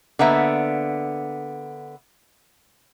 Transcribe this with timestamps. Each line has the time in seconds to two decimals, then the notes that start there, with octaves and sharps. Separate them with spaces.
0.19 D3 A#3 B3 E5